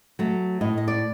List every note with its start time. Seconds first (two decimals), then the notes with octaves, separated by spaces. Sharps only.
0.19 F#3 A3
0.61 A2 D#5
0.78 D#5
0.88 D5